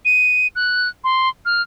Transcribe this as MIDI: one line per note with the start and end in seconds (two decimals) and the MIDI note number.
0.05 0.47 99
0.56 0.88 90
1.04 1.29 84
1.45 1.62 89